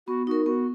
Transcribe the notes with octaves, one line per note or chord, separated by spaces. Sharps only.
B3 F#4
D#4 F#4 A#4
B3 F#4